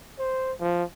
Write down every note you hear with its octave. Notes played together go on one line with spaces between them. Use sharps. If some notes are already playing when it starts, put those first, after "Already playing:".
C5
F3